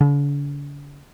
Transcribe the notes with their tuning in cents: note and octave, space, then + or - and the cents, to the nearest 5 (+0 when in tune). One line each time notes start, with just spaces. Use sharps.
D3 -45